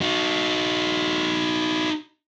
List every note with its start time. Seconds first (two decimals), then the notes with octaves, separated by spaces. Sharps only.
0.01 D#4 F#4